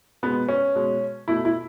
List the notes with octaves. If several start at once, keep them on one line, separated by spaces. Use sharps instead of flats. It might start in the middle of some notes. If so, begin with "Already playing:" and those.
B2 G#3 B3
C#4
B2 G#3
B2 A3 E4
E4